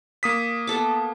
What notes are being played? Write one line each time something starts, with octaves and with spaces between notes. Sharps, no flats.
A#3 D#6 B6
B3 A4 D6